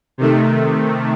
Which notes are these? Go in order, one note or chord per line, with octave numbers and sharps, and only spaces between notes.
C3 D#3 A3